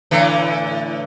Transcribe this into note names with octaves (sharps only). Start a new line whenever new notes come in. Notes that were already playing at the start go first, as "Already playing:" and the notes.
A2 D3 E3